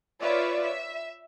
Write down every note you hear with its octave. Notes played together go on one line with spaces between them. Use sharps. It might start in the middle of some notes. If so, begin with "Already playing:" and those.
F4 B4 C#5 D5 E5
E5